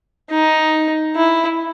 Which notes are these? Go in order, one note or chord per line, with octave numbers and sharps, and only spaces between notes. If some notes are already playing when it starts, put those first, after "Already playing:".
D#4
E4